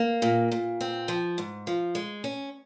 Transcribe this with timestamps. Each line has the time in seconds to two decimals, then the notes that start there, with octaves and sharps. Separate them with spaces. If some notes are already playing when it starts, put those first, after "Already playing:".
Already playing: A#3
0.22 A#2
0.52 A#2
0.81 C4
1.08 F3
1.38 G#2
1.67 F3
1.95 G#3
2.24 C#4